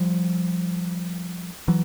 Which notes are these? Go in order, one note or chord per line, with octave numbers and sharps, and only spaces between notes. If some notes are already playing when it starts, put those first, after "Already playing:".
Already playing: F3 G3
E3 F#3